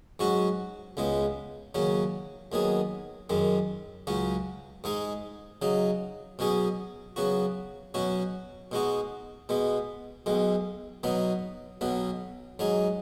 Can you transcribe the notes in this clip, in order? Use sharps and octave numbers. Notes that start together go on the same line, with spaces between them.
G#2 F#3 C#4 F#4
C#2 C#3 G#3 B3
D#2 C#3 F#3 C#4
D#2 D#3 F#3 B3 G#4
F#2 D#3 G#3
C#2 C#3 F#3 C#4
G#2 G#3 D#4 G#4
C#3 F#3 D#4
B2 F#3 C#4 G#4
C#3 F#3 B3 F#4
B2 F#3 C#4 F#4
B2 G#3 D#4 F#4
B2 G#3 B3
B1 B2 G#3
B2 F#3 B3 D#4
B1 B2 F#3 B3
G#2 F#3 D#4 G#4